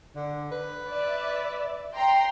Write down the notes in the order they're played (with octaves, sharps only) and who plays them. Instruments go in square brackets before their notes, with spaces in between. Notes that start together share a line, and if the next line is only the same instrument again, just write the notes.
[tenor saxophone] D3
B4
[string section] D5 E5
G5 A#5 C6